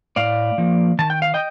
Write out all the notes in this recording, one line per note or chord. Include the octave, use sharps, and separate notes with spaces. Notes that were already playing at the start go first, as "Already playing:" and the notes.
A2 D5 F5
F3 A#3
D#3 A5
G5
F5
D#5 G5